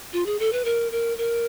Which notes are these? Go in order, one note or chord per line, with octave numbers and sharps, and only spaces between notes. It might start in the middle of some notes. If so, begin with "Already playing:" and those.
F4
G#4
A4
B4
A#4
A#4
A#4